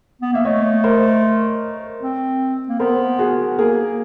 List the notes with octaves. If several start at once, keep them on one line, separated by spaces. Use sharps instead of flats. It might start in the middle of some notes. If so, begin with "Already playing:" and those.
B3
A#3 E5
A3 C#5 D#5
A#4 C5
C4
A#3
B3 A#4 C5
F#4 G#4
A#3 G#4 A#4